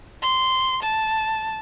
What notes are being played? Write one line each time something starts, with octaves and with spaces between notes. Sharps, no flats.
C6
A5